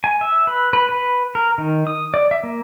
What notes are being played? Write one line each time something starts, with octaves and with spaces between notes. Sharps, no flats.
G#5
E5
B4
B4
B4
A#4
D#3
D#6
D5
E5
A#3